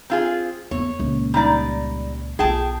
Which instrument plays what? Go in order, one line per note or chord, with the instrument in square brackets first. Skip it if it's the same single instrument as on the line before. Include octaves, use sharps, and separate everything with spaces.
[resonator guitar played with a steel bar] C4 F4 G#4
[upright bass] E2 B3 [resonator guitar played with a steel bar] C#5
[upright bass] C#2 A#2
[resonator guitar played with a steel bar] G3 D#4 D5
[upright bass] B1 F4 [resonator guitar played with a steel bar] G#4 G5 A5